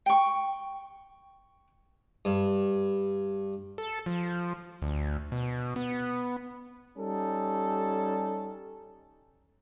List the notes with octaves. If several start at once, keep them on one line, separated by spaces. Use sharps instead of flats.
G5 C#6
G2
A4
F3
D2
B2
B3
G3 C#4 D#4 A4